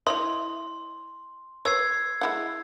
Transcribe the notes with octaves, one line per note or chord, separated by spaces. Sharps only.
E4 C#5 D#5 C6
B4 C#5 E6 G#6 C7
G#3 E4 F#5